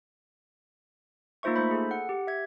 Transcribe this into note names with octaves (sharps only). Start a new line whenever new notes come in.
A#3 D#4 F4 C5 E5 C#6
A3 D#4 C5 B5
G#4 A4
F#5
G4
E5 G#6